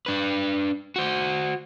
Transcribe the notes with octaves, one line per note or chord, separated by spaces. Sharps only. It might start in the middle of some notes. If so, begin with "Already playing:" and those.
D4 B4
F#4 C5